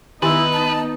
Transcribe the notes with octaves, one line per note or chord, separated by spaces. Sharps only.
D#3 B3 D#4 E4 G4 B4 D#5 G#5
A5